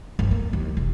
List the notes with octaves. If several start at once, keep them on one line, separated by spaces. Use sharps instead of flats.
G1
A#3
D#2
E1